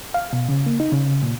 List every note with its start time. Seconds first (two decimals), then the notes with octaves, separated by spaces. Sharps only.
0.14 F5
0.33 B2
0.49 C#3
0.66 A#3
0.80 D#4
0.92 C#3
1.23 A#2